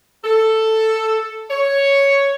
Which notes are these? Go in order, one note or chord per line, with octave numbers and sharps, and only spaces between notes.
A4
C#5